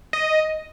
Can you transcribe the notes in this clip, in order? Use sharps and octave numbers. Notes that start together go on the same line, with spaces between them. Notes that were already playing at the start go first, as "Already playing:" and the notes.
D#5